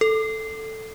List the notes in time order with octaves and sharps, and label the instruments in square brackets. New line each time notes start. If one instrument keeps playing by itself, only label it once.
[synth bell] A4